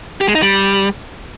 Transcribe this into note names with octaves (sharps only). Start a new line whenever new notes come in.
G4
G#3
D#4
G3